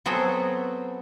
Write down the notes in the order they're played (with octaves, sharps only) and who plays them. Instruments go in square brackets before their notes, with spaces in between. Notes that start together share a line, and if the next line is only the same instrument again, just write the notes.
[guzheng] F#3 B3 C4 F#4 G#4 A4